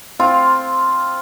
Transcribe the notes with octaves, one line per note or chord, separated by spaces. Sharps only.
C4 F4